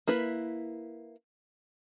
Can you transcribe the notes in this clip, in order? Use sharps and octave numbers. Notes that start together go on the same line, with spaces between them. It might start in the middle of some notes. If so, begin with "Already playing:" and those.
A#3 E4 B4